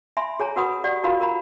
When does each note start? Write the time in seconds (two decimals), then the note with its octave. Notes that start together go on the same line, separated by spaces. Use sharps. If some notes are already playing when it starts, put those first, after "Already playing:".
0.17 E5 G#5 B5 C6
0.40 G#4 C#5 G#5 A#5
0.56 F#4 A#4 B4 F#5 B5 D#6
0.84 G4 D5 F#5
1.03 D#4 F4 F#4 A#4 F5 B5
1.20 F4 A#4 A#5 B5